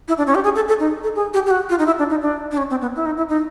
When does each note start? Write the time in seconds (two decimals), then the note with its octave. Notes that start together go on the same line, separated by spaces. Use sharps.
0.08 E4
0.18 D4
0.27 C#4
0.35 G4
0.44 G#4
0.55 A4
0.68 A4
0.80 D#4
1.03 A4
1.15 G#4
1.34 G4
1.46 G4
1.51 F#4
1.69 F4
1.79 D#4
1.86 E4
1.98 D4
2.10 D#4
2.22 D4
2.51 D4
2.57 C#4
2.70 C4
2.81 B3
2.96 E4
3.06 D#4
3.17 E4
3.29 D#4